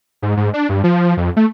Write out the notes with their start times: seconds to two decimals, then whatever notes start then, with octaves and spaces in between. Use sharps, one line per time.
0.22 G#2
0.37 G#2
0.54 D4
0.69 G2
0.84 F3
1.17 F2
1.37 A3